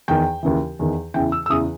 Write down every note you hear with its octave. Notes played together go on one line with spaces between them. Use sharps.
E2 D#3 G5
D#2 C#3 E3
E2 D#3
E2 C#3 E3 G5
E6
E6
E2 C#3 E3 D#6